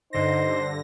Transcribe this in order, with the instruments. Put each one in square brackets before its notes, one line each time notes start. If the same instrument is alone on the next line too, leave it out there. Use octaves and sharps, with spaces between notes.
[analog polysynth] G2 D3 A#6 [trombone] D#4 [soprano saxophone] C5